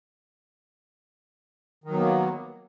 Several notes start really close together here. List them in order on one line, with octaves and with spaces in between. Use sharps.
D#3 F#3 B3 A#3